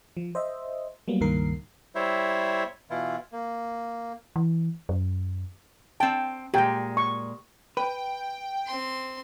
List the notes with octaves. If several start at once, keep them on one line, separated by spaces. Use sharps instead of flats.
F3
C5 D#5 E5
F#3 G3 A#3 B3
C#2 G2 D#3 A#3 A#4 C7
G3 E4 C5 C#5 E5
B2 E3 E4 F4
A#3
E3
F#2
C4 G5 A5
A#2 G#3 G4 G5
C#6
B4 G5
C4 C6